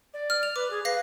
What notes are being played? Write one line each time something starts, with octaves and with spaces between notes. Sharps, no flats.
D5
F6
F7
B4 D6
G#4
B4 F5 A#6 C7